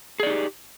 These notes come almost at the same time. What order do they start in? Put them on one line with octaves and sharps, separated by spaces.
G#4 D5 D#4 G4